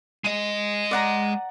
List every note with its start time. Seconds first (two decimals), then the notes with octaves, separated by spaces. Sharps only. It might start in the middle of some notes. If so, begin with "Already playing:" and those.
0.24 G#3 D#5
0.91 D5 F#5 A#5